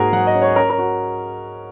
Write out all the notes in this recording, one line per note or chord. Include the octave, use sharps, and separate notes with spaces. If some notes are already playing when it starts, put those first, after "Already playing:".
Already playing: G#2 A#3 F#4 G#4 A#4
F#3 F#5
D#5
C#4
C#5
C#4 A#4
A#4
F#4